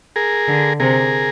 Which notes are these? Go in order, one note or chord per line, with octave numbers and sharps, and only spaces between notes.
G#4 A#4
D3
C3 G#4 A#4